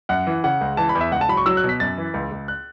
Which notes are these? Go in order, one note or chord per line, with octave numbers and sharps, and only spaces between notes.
F#2 F#5
E3
C#3 F#5
C#2
E3 A5
B5
E2
E5
C#2 F#5
A5
F#3 B5
C#6
F#3 E6
F#6
B2
B6
F#2 A6
E3
C#2
C#2
F#6